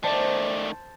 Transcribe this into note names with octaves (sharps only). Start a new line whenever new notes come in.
D#3 A3 C5 D5 A5